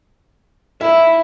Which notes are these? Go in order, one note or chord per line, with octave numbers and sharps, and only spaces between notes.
E4 E5